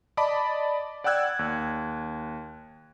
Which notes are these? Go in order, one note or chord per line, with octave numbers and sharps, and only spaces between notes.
D5 D#5 A5 B5 D6
D5 F#5 G5 E6 F#6 G#6
D#2